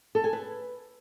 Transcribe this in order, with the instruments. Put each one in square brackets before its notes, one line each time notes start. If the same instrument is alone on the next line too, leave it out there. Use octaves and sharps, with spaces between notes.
[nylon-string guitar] A4
G#5
B4